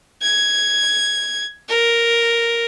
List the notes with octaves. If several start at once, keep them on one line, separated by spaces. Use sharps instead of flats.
G#6
A#4